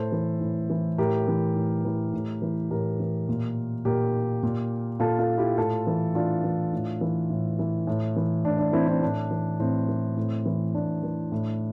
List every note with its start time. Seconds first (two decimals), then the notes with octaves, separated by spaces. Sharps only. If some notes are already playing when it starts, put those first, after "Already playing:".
Already playing: A2 A4 C5
0.12 E3
0.41 A2
0.70 E3
0.98 A2 G4 A#4
1.28 E3
1.56 A2
1.85 E3
2.13 A2
2.42 E3
2.70 A2 G4 A#4
3.00 E3
3.29 A#2
3.85 A#2 G4 A#4
4.43 A#2
5.00 A#2 F4 A4
5.19 F4 A4
5.38 E4 G4
5.58 A2 F4 A4
5.87 E3
6.15 A2 D4 F4
6.44 E3
6.73 A2
7.01 E3
7.30 A2
7.59 E3
7.87 A2
8.16 E3
8.45 A2 D4
8.59 D4
8.73 E3 C4 E4
8.88 C4 E4
9.02 A2 D4
9.31 E3
9.60 A2 C4
9.89 E3
10.17 A2
10.46 E3
10.74 A2 D4
11.03 E3
11.32 A2